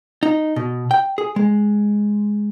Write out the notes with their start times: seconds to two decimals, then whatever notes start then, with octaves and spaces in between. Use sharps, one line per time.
0.23 D#4
0.56 B2
0.91 G5
1.18 G#4
1.36 G#3